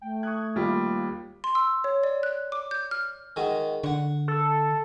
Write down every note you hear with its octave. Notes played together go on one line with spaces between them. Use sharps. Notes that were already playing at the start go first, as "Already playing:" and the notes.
A3 G5
C#6 D#6 F#6 G#6
D#2 G3 F4
C6
E6
C#5
D5
F#6
D6
G6
F6
D#3 G#3 F#4
D3 F#5 C#6
A4